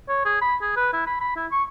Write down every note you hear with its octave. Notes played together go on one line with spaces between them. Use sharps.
C#5
G#4
B5
G#4
B4
E4
B5
B5
E4
C#6